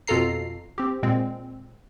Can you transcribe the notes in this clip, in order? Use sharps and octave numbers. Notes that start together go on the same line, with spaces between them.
F2 B2 F4 A4 A#5 C7
C4 G4
A#2 G#3 C4